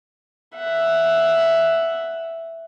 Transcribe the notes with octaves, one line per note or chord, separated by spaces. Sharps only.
E5 F#5